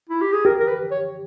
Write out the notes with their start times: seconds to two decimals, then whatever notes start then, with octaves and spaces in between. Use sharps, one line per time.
0.09 E4
0.21 G4
0.33 G#4
0.45 G4 A#4
0.60 A#4
0.68 B4
0.91 C#5